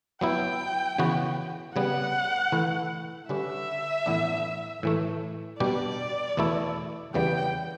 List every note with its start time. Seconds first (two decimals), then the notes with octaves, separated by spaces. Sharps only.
0.21 F#3 B3 E4 G5
0.98 C#3 E3 B3 F#4 B4
1.75 C#3 G3 B3 F#5
2.52 E3 A3 E4
3.29 D3 G3 C#4 G4 B4 E5
4.06 A2 E3 B3 D4
4.83 A2 E3 A3
5.60 B2 G3 D4 G4 D5
6.37 E2 B2 A3 E4 A4
7.14 E2 C#3 E3 G3 B3 G5